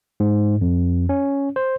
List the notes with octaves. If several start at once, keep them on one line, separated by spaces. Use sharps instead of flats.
G#2
F2
C#4
C5